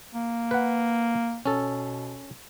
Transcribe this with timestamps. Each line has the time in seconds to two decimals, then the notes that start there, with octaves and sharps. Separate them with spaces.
0.14 A#3
0.51 B4 F#5
1.46 B2 C#4 A4